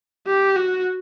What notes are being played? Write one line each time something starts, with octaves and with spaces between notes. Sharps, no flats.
G4
F#4